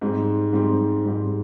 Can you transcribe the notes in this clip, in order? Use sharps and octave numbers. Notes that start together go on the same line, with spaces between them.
G#2 G3 C4
G#2 G3 C4
G#2 G3 C4